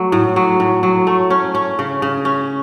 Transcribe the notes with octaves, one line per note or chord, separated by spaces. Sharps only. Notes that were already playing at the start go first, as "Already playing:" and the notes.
Already playing: F#3 A3
A2
F#3
A2
F#3
A3
C#4
C#4
C#3
C#3
C#4